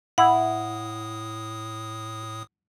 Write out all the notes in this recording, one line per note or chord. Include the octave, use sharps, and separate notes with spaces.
A2 E4 F#5 D#6